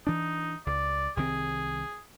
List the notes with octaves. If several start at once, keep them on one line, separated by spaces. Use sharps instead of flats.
E3 D4 D#4
C#2 D5
C2 D#3 C4 G#4